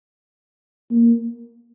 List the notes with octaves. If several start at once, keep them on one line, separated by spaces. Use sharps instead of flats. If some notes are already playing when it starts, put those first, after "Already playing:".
A#3